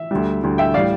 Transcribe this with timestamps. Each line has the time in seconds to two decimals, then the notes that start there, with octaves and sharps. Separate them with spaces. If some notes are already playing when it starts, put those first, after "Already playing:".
Already playing: E5
0.11 D2 D3 G3
0.43 D2 D3 G3
0.58 E5 G5
0.74 A2 G3 D5 F5